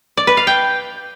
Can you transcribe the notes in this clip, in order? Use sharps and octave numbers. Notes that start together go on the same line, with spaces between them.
D5
B4
F5
G5